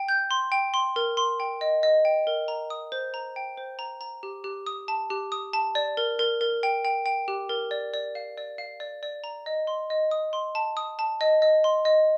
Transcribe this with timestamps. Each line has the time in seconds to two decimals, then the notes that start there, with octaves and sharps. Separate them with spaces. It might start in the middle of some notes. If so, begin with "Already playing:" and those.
Already playing: G5
0.09 G6
0.31 C6
0.52 G5
0.74 C6
0.96 A#4
1.17 C6
1.40 G5
1.61 D#5
1.83 D#5
2.05 G5
2.27 A#4
2.48 A#5
2.70 D#6
2.92 C5
3.14 A#5
3.36 G5
3.58 C5
3.79 A#5
4.01 A#5
4.23 G4
4.44 G4
4.66 D#6
4.88 A5
5.10 G4
5.32 D#6
5.53 A5
5.75 D5
5.97 A#4
6.19 A#4
6.41 A#4
6.63 G5
6.85 G5
7.06 G5
7.28 G4
7.49 A#4
7.71 D5
7.94 D5
8.15 F5
8.37 D5
8.58 F5
8.80 D5
9.03 D5
9.24 A#5
9.46 D#5
9.67 C6
9.90 D#5
10.11 D#6
10.33 C6
10.55 A5
10.77 D#6
10.99 A5
11.21 D#5
11.42 D#5
11.64 C6
11.85 D#5